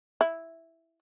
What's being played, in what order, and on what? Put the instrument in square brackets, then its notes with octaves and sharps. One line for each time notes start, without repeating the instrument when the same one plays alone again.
[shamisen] E4